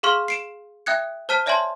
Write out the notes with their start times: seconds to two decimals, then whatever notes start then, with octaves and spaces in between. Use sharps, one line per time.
0.03 G#4 F5 C6 C#6 F6
0.28 C7 D7 E7
0.86 E5 G5 D#6 F#6 G#6 C#7
1.29 C5 A5 F6 B6 D#7
1.46 C#5 D5 E5 G#5 A5 C6